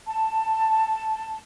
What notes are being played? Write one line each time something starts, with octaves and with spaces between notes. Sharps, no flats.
A5